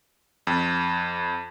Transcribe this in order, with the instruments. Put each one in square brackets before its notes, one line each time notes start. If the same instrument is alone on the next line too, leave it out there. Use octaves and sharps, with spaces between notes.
[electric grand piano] F2